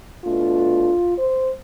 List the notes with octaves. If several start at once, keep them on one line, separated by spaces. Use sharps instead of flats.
B2 A3 D4 F4
C5